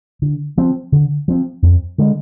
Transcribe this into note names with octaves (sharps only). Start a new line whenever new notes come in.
D3
F3 C4
D3
F3 C4
F2
D3 G#3